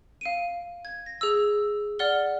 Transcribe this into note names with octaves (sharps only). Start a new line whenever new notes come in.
F5 D7 D#7
G#6
A#6
G#4 E6
D5 F#5 F6 G7